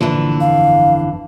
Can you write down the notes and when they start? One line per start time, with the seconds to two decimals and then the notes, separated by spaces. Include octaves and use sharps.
0.01 G1 A#2 D3 E3 F3
0.40 G1 F2 F5